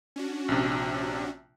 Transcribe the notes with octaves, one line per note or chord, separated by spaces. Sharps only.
C#4 D4 F#4
A#1 C3